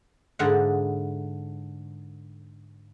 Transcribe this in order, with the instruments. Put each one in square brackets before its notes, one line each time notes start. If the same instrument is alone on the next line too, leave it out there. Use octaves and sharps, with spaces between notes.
[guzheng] G#2 D3 E4 D5 F5 F#5